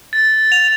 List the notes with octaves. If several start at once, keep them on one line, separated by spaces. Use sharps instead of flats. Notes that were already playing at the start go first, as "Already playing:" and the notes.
A6
F7